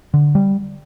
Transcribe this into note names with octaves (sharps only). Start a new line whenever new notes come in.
D3
G3